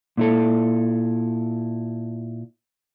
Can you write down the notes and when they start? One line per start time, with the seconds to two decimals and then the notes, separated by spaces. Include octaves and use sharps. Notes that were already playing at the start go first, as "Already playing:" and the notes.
0.17 A#2 E4 A4